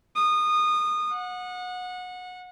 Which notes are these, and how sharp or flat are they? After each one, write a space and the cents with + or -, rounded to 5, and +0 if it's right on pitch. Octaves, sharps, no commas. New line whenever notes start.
D#6 -25
F#5 -25